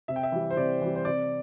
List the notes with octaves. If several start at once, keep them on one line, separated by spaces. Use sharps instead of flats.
C3 E5
G5
E5
E3 G3
C5
C3 D5
E3 G3
C5
C3 D5